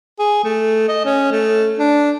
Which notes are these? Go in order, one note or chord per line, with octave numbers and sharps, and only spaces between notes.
G#4
A3
D#5
C#4
A3
D4